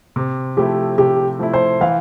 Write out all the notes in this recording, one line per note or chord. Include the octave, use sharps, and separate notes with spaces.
C3
F3 A3 E4 G4
C3 G4
F3 A3 E4
C5
E3 F5